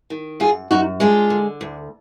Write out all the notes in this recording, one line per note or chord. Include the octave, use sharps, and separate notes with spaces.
D#3
F#2 F4 G#4
F#2 D#4 F#4
G#3 D4 F4
D3
D2